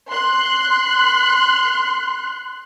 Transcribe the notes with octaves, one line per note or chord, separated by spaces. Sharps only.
C6 F#6